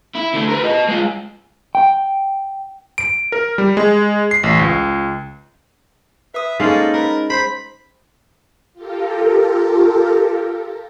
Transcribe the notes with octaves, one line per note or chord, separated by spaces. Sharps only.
E4
D3 A3
A#4 B4
F#4 D#5
G#3 F4
G5
D7
A#4
G3
G#3
C7
A1
C#2
B4 E5 D#6
G#3 A#3 C#4 D#4 A4 C5 D#5
A#4 B4
C5 B5
F4 G4 A4 A#4